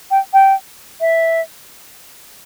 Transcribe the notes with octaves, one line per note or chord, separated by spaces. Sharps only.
G5
G5
E5